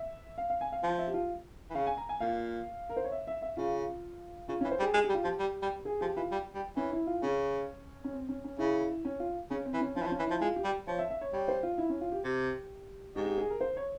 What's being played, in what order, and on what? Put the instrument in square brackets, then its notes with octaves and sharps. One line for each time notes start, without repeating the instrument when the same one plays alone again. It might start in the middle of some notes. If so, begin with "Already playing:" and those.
Already playing: [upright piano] E5
F5
F5
G#5
F5
[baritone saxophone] F3 [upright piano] F5
[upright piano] E5
G4
F4
[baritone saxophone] E3
[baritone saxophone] C#3 [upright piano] F5
[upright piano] G#5
A#5
G#5
[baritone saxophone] A#2 [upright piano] F5
[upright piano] A#4
C5
C#5
E5
E5
E5
[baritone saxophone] C#3 [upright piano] F4
[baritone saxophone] C#3 [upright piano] F4
[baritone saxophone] E3 [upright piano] C#4
[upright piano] C5
[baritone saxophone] G3
[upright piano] G#4
[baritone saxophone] G#3 [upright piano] G#4
[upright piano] G4
[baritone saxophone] G3
[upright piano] F4
[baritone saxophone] F3 [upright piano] G4
[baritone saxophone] G3
G3
[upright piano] G#4
[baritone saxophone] F3 [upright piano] G4
[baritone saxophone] E3 [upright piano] F4
[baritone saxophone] G3
G3
[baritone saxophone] E3 [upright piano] C#4
[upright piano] E4
F4
[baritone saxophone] C#3 [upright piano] C#4
[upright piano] C#4
C4
C#4
C#4
[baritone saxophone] C#3 [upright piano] E4
[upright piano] C#4
F4
[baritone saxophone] C#3 [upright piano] C#4
[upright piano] C4
[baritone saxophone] E3
[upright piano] C#4
[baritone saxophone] F3 [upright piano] C#4
[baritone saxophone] E3
F3
[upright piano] C#4
[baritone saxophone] E3
[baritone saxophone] F3 [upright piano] E4
[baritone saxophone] G#3 [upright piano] F4
[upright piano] G4
[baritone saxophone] G3
[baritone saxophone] F3 [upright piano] C#5
[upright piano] E5
E5
C#5
[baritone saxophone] G3 [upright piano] C#5
[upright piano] C5
F4
E4
C#4
F4
G4
[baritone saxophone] C3
[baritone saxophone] G#2 [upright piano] G4
[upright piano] G4
G#4
A#4
C5
C#5